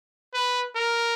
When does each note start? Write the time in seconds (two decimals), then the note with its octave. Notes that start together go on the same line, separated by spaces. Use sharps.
0.34 B4
0.76 A#4